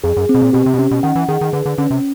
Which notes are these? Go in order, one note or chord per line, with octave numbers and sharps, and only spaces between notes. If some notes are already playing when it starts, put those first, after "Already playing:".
F2 G#4
F#2
C4
B2
A#2
B2 G4
C3
B2
C3 C#4
B2
D#3 F#5
E3
D#3 G#4
D#3
D3 B4
D3
D3 C#4
C3